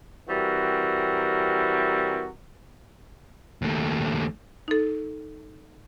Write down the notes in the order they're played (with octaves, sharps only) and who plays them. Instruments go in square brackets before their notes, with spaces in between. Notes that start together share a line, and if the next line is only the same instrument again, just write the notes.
[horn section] E3 G3 C4 F#4 A#4
[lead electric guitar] D#2 A3
[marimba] D#4 A4